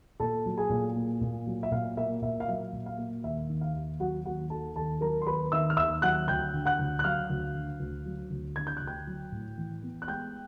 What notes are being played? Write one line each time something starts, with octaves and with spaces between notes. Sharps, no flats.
A#2 A4 A5
F#3
G#4 G#5
A#2
A#3
A#2
F#3
E5
A#2 F5
A#3 E5
A#2 E5
F5
F#3 E5
A#2
F5
A#3
D#2 E5
D#3
F5
D#2
F#3 F#4 F#5
D#2 F#4 F#5
D#3 A4 A5
D#2 A4 A5
F#3 A#4 A#5
C6
D#2 B4 B5
D#3 E5 E6
F6
D#2 E5 E6
F#3 F#5 F#6
D2 G5 G6
D3
F#5 F#6
D2
F#6
F#3 F5 F6
D2
D3
D2
F#3
D2
D3 G#6
G6
F#6
D2
G5 G6
F#3
A2
E3
B3
F#6
G#3 G5 G6